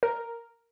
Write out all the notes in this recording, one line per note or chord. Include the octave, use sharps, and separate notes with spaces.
A#4